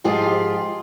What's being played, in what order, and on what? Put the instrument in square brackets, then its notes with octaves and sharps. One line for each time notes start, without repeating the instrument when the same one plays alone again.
[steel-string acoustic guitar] G#2 F3 F4 G4 G#4